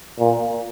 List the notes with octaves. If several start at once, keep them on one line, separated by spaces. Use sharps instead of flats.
A#2